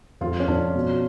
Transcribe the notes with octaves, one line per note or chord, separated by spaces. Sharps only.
F2 F4
C#4
F2 D4
B2